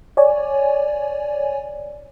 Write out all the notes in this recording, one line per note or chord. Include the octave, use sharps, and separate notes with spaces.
C#5 D5 G#5